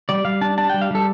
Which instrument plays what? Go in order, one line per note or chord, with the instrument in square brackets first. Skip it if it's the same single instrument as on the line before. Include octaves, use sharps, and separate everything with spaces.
[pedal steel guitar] G3 D5
G3 F5
D4 A5
D4 A5
G3 G5
F5
G3 A4